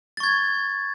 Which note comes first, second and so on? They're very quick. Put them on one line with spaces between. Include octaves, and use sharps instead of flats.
A6 C#6 G#6